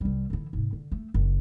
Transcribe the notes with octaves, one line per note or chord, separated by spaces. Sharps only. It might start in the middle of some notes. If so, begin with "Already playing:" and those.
C2 G3
D3 E3
G#2 C3
D3
A3
F#1